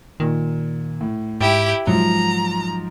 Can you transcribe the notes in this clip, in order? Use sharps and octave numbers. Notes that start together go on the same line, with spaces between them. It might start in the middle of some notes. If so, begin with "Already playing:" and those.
A#2 D#3
A2
G#2 E4 G4 G5
G#2 F3 F#3 A#5